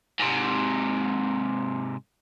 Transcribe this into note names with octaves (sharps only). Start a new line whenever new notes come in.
G#2 C3